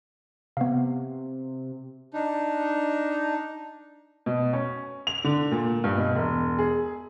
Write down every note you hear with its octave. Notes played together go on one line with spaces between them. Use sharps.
C3 B3 F5
D4 D#4
B2
C#4
F7
D3
A#2
G2
B2
E1
G#4